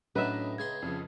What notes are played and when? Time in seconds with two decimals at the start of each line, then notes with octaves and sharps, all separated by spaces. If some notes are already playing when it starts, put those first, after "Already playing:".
0.16 A2 F#3 C#4 D4 B4 D#5 E5 A#5
0.58 C#2 G#4 C6 G#6
0.82 F2 C#3 F3